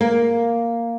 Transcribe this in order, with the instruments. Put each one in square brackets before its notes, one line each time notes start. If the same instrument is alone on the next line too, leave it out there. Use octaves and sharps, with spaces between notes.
[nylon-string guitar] A#3